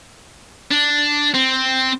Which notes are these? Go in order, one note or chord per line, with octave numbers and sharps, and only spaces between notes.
D4
C4